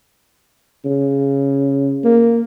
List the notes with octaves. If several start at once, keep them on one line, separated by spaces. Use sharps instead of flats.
C#3
A#3